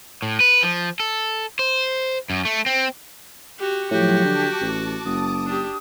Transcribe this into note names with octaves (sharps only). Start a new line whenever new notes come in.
A2
B4
F3
A4
C5
F#2
A3
C4
F#4 G4
A2 F3 F#3 F#4 G4
D3 A5 D6
A1
F#1 D#6
D4 G4